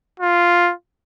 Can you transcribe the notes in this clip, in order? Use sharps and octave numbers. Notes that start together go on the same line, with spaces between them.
F4